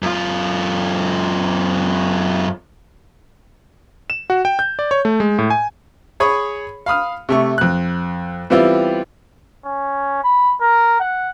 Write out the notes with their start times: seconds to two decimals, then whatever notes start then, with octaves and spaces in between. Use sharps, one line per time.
0.02 F#2 F4
4.10 E7
4.30 F#4
4.45 G5
4.59 G6
4.79 D5
4.91 C#5
5.05 A3
5.20 G#3
5.38 A2
5.50 G#5
6.20 G#4 C#5 B5 C#6 D#6
6.86 F5 B5 D#6 F6
7.29 C3 A3 C#6
7.58 F2 F#6
8.50 E3 G3 B3 C4 E4 F4
9.65 C#4
10.24 B5
10.61 A#4
11.00 F#5